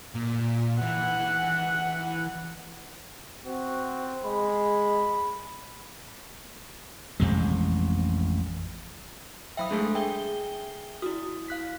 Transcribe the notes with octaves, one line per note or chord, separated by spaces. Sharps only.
A#2
E3 F#5
C4 F#4
G#3 B5
A1 F2 C3 G#3
F#3 E5 G5 B5 D#6
G#3 A3 D4 G#4 A4
G#4 E5 G5 G7
E4 F#4 D#6
F5 F#6 B6